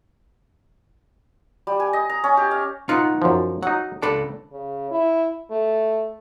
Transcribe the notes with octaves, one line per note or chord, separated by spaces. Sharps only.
G3
G#5
D#5
A#5
C#4
G4
F5
D#4 F4 B4 F#5
F#2 F3
F#3 D#4 F#5
C#2 D4 A4 B5
C#3
E4
A3